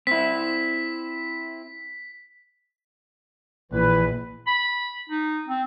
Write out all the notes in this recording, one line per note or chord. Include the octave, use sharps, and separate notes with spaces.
C4 E4 B6
A#1 E3 E4 B4
B5
D#4
C4